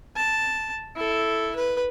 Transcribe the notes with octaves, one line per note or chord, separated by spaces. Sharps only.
A5
E4 A4
B4